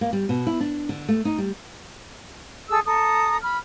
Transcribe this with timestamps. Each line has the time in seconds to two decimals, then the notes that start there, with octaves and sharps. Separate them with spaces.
0.01 A#3
0.13 G3
0.29 B2
0.47 E4
0.60 D4
0.89 D3
1.09 A3
1.25 D#4
1.38 G3
2.69 G#4 A4 A5 E6
2.86 A4 A#5 D#6
3.42 B5 F6